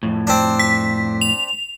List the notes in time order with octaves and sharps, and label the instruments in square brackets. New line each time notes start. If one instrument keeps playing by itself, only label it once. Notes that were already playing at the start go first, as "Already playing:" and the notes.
[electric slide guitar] F2 A2
[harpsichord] C4 D4
[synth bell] B6
F7